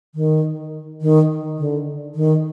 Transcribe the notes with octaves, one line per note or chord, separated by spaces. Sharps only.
D#3
D#3
D3
D#3